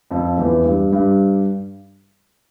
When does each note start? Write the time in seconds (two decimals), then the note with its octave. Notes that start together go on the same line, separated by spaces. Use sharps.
0.11 F2 F3
0.38 E2 E3
0.65 G2 G3
0.92 G2 G3